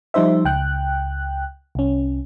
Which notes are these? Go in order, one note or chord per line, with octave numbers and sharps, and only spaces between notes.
F3 G3 D#4 C5 E5
C#2 G5 F#6
C2 C#4